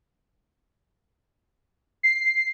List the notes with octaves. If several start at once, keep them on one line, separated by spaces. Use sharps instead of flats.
C7